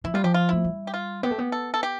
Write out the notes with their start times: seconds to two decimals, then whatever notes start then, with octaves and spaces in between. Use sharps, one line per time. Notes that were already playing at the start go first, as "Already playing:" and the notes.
0.04 F3 E4
0.14 G3 F4
0.24 F3 G4
0.34 F4
0.49 A3 E4
0.64 G3
0.87 G4
0.94 F4
1.23 B3 G4
1.31 A3
1.38 B3
1.52 A4
1.74 A4
1.83 G4